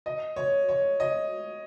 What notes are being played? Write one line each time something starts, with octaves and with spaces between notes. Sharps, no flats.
D#5
C#5
C#5
D#5